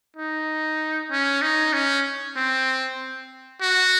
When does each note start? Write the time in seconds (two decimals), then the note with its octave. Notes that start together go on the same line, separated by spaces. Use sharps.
0.16 D#4
1.11 C#4
1.42 D#4
1.73 C#4
2.36 C4
3.61 F#4